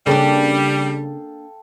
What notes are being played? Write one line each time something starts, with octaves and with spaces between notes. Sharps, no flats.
C#3 G3 A#3 D4 A4 F5 G5